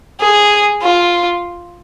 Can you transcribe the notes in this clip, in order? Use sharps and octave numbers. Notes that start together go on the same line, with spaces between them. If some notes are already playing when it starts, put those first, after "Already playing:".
G#4
F4